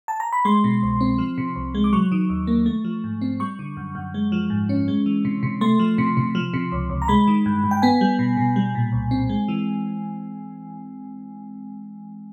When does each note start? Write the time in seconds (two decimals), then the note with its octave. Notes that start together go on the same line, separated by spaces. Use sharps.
0.08 A5
0.20 A#5
0.32 B5
0.45 G#3 C6
0.64 B2
0.82 C2
1.01 C4
1.18 F3
1.38 C3
1.56 C2
1.75 G#3
1.84 D6
1.93 F#3 C#6
2.12 D#3
2.30 D#2
2.47 A#3
2.66 A3
2.84 F3
3.04 G#2
3.21 C4
3.40 G3 C#6
3.59 D3
3.77 F#2
3.95 F#2
4.14 G#3
4.32 F3
4.50 G#2
4.69 C#4
4.88 G#3
5.06 E3
5.25 C3
5.43 C3
5.61 A3 C6
5.79 F3
5.98 C3
6.17 C3
6.35 F3
6.54 C3
6.72 C#2
6.90 C#2
7.02 A#5
7.08 G#3 B5
7.27 D#3
7.46 G2
7.64 G2
7.71 G5
7.82 B3 G#5
8.01 G3
8.19 B2
8.37 B2
8.56 G3
8.75 A#2
8.92 C2
9.11 C4
9.29 G#3
9.48 E3